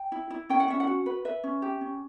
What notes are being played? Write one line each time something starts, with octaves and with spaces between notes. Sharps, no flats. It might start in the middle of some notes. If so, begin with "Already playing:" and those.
Already playing: G5
E4
E4
C#4 G5
F#5
C#4 E5
F#5
F#4
B4
B4 E5
C#4
G4
C#4